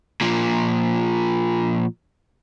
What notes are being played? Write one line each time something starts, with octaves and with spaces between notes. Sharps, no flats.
A#2 F3